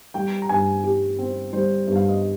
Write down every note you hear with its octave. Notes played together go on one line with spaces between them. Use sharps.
G3 G5
A#5
G2 G#5
G4
C4
G3 C5
G2
F5
D#5